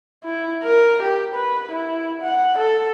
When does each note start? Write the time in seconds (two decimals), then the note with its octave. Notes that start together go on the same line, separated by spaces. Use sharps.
0.24 E4
0.63 A#4
1.03 G4
1.35 B4
1.71 E4
2.22 F#5
2.59 A4